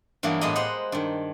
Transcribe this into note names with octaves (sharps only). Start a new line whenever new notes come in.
G2 E3 F#3 A#3 B3
A2 G#3 B3 G4 D#5
C5 D#5 F#5 A#5
G2 D#3